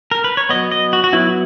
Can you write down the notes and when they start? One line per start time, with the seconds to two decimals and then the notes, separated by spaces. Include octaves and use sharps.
0.11 A#4
0.24 B4
0.37 C#5
0.49 F#3 B3 D#5
0.71 D#5
0.93 F#4
1.04 F#4
1.13 F#3 B3 E4